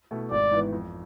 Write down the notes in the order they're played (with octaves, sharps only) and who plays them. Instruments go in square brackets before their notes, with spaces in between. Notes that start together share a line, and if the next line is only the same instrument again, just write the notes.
[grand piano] B2 A3 E4
[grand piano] G#1 [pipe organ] D5
[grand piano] G#2 E3 B3
F2